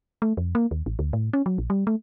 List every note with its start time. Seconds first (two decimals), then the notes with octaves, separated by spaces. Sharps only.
0.22 A3
0.37 F2
0.55 A#3
0.71 D#2
0.86 A1
0.99 D2
1.13 A2
1.33 C#4
1.46 F#3
1.58 A#1
1.70 G3
1.87 A3